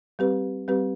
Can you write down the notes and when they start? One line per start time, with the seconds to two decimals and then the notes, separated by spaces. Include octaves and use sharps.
0.19 G3 C4 G4 B4
0.68 G3 C4 G4 B4